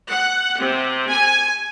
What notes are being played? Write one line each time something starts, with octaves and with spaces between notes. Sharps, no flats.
F#5
C3
G#5